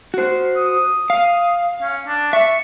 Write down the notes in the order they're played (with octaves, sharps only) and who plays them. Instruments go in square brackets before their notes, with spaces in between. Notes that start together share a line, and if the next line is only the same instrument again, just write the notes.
[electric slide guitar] F#4 C5
[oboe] D#6
[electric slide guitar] F5
[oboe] C#4
D4
[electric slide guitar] E5 [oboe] C#6